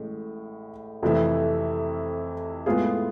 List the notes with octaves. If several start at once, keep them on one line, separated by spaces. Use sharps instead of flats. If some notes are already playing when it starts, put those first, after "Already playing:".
Already playing: A1 A2 G#3
F2 C3 E3 A3 E4
A2 G#3 B3 F4 G#4